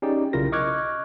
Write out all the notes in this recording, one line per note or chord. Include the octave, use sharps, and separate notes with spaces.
C#4 D#4 G4 G#4 D5 G5
B1 C#3 E4 F4 A#4 A#6
D#5 C#6 D6 F6 F#6 G#6